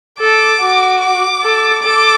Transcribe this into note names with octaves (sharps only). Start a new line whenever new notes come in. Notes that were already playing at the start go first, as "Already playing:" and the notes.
A4 D6
F#4
D6
A4
A4 D6